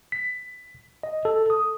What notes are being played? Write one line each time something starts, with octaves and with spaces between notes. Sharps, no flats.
B6
D#5
A4
D#6